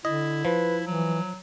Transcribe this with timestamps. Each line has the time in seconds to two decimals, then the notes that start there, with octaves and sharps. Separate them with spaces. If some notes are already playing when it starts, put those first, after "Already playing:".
0.05 D3 E4 D#5
0.45 F3 B4
0.87 E3 F#3